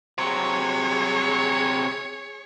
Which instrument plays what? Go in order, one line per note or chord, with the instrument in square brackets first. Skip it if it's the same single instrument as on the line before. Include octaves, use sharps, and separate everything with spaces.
[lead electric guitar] C3 F#3 [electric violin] G#4 C#5